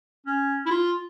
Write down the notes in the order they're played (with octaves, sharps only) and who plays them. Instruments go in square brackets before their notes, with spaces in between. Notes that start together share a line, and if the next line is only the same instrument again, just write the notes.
[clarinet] C#4
E4
F4